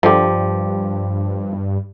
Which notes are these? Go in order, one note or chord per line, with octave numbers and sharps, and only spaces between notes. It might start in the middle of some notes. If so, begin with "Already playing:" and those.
G2 D3 F3 G4